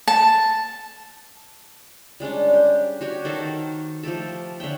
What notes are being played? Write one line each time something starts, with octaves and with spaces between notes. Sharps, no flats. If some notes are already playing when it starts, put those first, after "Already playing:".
A5
G3 G#3 C#4 D4
G4
F#4 G4 C#5
D#3 A4 A#4 C5
F3 A3 G4 A4
D3 C#5 E5 G5